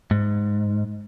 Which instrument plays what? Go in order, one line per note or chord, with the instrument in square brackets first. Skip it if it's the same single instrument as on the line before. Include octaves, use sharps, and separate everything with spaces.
[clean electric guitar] G#2